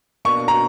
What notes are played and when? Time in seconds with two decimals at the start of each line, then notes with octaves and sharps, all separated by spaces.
0.25 B2 A#3 D4 C#6
0.48 A#5